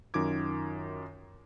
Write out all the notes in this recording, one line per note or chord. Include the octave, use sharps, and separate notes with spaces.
F#2 D#3 F4 D6 G#6